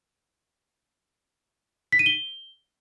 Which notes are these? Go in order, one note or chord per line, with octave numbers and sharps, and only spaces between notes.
B6
D#7
G7